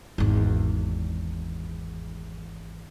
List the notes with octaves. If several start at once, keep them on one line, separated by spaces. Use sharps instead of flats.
G#1 E2